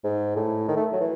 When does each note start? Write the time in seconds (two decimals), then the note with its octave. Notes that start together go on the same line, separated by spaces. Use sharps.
0.04 G#2
0.36 A2
0.68 D#3
0.76 A3
0.93 F#3
1.00 E3